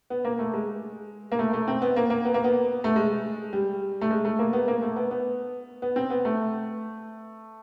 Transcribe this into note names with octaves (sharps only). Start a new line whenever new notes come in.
B3
A#3
A3
G#3
A#3
A3
A3
C4
B3
A#3
A#3
B3
A#3
B3
A3
G#3
G3
A3
G#3
A3
A#3
B3
A#3
A3
B3
B3
B3
C4
B3
A3